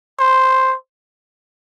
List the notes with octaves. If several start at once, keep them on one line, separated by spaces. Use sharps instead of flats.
C5